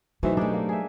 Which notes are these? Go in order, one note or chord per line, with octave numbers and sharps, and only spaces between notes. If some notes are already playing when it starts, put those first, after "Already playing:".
B2 E3 F#3 A3 D#4 C5 E5
A3 D4 D#4 G4 G#4 C5
A#3
G#4 E5